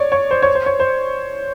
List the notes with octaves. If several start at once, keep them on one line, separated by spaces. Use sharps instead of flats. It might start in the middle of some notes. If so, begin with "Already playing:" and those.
Already playing: C#5 D5
C#5
C5
C#5
C5
C#5
C5